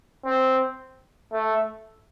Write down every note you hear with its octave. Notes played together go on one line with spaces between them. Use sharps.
C4
A3